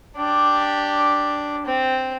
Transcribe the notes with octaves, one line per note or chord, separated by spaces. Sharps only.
D4 G4
C4